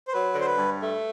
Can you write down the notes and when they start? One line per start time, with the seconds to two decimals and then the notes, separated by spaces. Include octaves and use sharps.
0.08 C5
0.12 F#3 B4
0.35 D3
0.40 C5
0.46 B4
0.58 G2
0.80 A3